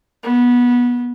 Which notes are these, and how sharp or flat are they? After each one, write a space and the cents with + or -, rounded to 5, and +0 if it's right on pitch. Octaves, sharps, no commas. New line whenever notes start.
B3 -20